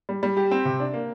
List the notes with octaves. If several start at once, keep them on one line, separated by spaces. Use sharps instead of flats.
G3
G3
G4
C4
C3
D4
A#3